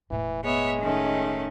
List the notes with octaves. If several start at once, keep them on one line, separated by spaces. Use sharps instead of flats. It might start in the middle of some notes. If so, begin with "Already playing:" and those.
E1 A2 E3
G#3 B3 C#5 E5
D#3 A3 C#4